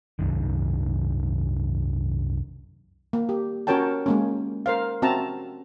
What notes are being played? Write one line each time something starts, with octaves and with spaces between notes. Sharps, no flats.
C2 F#2 D#3
A#3
G4
C#4 F#4 A#4 C#5 G5 A5
G#3 A#3 C#4
A#4 C5 F5
C4 C#4 F#4 E5 A5 A#5